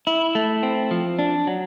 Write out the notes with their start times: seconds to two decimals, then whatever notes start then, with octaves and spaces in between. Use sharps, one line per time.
0.07 E4
0.35 A3
0.63 C4
0.91 F3
1.19 D4
1.47 F#3